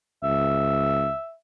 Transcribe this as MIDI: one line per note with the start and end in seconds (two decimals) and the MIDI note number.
0.24 1.11 37
0.24 1.34 76